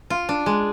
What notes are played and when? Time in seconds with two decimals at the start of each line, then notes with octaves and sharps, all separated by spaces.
0.10 F4
0.29 D4
0.46 G#3